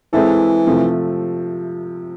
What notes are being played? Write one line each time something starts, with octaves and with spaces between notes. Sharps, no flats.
E3 G#3 C4 E4 A4
C3 F3 A3